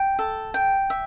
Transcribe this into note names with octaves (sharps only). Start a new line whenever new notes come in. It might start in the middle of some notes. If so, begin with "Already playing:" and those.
Already playing: G5
A4
G5
E5